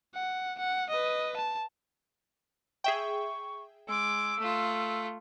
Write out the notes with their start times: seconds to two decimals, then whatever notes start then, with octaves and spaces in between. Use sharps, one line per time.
0.14 F#5
0.59 F#5
0.90 B4 D#5
1.37 A5
2.84 G#4 E5 G5 C#6
3.88 G#3 D6 E6
4.39 A3 F4